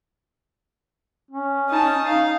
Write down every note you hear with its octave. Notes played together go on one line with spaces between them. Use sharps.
C#4
D#4 A5
D#4 F5